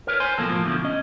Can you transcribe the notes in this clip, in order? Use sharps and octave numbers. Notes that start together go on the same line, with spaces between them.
A#4 B4 C#5
C5 G#5 C6
B2 F3 F#3 A#3 A4
A2 F3 A#3
D2 B2 D3 D#3 F3
C#4 D#5